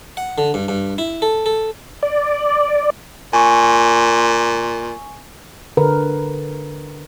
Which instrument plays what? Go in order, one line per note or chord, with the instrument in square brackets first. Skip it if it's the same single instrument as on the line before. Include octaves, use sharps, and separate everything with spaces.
[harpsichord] F#5
D3
G2
G2
E4
A4
A4
[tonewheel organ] D5
[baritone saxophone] A#2 [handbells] G#5 C#6
[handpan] D3 A#4 B4